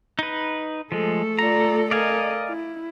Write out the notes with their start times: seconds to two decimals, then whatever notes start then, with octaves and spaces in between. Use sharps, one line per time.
0.19 D#4 B4
0.92 F3 G#3 A3 A4
1.39 F4 D5 A#5
1.91 A#4 D5 D#5 F5 G#5
2.49 E4